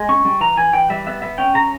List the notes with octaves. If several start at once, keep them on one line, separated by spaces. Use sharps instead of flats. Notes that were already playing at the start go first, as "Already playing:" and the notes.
Already playing: G#3
C#4 C#6
G3
E3 A#5
E3 G#5
E3 G5
G3 E5
B3 E5
B3 E5
C#4 G5
C#3 A#5